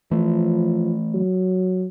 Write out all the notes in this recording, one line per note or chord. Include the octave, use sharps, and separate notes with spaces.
E3 F3 A3
F#3